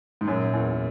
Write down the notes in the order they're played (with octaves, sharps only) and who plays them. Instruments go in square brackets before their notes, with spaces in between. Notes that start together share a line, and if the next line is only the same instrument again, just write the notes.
[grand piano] G#2
[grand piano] F#2 [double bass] A#2
[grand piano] E2